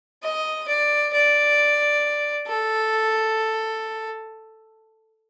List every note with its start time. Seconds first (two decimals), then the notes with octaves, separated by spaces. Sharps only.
0.23 D#5
0.68 D5
1.13 D5
2.47 A4